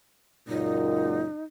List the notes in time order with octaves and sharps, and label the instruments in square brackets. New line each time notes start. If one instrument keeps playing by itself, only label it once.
[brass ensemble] C#2 F#2 A#2 [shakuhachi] D#4